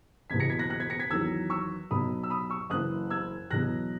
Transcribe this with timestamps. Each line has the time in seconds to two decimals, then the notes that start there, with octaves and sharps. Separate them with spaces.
0.30 F#1 E2 B2 G#6 B6
0.40 A#6 C#7
0.49 G#6 B6
0.59 F#6 A#6
0.70 F#6 A#6
0.80 G#6 B6
0.90 A#6 C#7
0.99 G#6 B6
1.10 E2 D#3 F#3 E6 G#6
1.50 C#6 E6
1.91 B1 B2 F#3 B5 D#6
2.23 E6
2.30 B5 D#6
2.50 C#6 E6
2.70 F#1 F#2 E3 D#6 F#6
3.10 E6 G#6
3.51 E2 B2 F#3 F#6 A#6